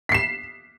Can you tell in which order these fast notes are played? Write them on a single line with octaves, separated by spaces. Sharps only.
B6 C7 E7